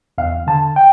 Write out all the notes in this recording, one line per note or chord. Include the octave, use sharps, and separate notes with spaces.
E2 F5
D3 A5
G5